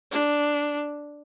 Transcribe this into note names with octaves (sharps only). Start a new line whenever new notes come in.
D4